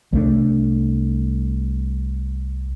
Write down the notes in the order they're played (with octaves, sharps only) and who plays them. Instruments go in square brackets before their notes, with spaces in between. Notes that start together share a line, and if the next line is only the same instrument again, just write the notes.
[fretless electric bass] C2 A3 D4